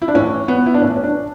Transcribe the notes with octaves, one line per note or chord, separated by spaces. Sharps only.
E4
D4
A2 C#4
E3
B3
E4
D4
A2 E3 C#4
C#4
D4